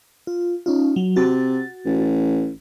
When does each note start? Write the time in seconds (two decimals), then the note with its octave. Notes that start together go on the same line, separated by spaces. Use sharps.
0.27 F4
0.66 C#4 D#4 F4
0.96 F#3
1.16 C3 F#4 A6
1.86 A1